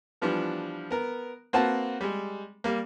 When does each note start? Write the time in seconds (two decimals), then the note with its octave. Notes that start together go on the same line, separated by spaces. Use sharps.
0.22 E3 F3 G3 B3 D4
0.90 B3 A#4
1.53 A#3 C4 F#4 B4 F#5 A5
2.01 G3 G#3
2.64 G3 A#3